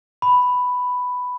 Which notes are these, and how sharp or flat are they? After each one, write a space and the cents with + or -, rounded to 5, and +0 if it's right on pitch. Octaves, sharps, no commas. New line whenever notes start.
B5 +5